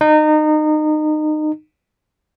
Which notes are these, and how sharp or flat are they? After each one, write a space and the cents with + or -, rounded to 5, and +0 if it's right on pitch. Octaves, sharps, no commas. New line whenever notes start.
D#4 -25